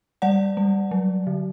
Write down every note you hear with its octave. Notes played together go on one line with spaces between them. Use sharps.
G3 D5 F#5
G3
F#3
D3